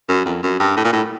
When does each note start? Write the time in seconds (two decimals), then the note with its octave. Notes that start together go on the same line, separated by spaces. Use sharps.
0.09 F#2
0.25 F2
0.43 F#2
0.60 G2
0.77 A2
0.84 A#2
0.93 A2